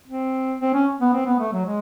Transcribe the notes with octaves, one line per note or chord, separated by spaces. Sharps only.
C4
C4
C#4
B3
C4
B3
A3
F#3
G#3